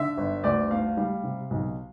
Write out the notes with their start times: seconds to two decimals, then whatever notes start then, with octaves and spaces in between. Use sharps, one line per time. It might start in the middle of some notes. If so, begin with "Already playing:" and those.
Already playing: D3 E5
0.17 G1
0.43 D2 D5
0.71 A3 F5
0.97 G3 F5
1.23 C3
1.51 B1